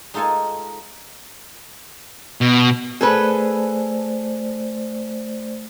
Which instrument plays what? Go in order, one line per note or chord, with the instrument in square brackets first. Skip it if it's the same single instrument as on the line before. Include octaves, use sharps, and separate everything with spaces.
[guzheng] G#3 D#4 F4 A4 F5 G#5
[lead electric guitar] B2
[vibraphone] A3 C5 D5 [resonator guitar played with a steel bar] G#4 A4 B4